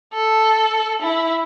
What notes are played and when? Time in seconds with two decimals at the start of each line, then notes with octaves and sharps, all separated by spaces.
0.14 A4
1.02 E4